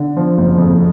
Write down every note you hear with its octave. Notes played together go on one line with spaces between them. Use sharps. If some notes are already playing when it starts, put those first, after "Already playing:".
Already playing: D3
F3
F#1
F2